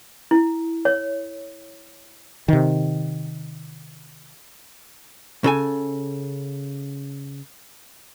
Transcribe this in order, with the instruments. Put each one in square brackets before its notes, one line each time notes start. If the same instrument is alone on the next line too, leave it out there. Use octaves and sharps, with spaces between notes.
[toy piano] E4
C#5
[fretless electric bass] C3 D#3
[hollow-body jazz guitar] C#3 A4 G#5